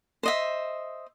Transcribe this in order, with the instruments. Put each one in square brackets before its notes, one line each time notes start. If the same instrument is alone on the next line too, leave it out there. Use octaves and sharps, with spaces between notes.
[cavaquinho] C5 D#5 E5